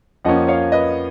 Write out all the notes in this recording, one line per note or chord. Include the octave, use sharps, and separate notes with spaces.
F2 F3 A#3 C#4 D#5 F#5
C#5 F5
B4 D#5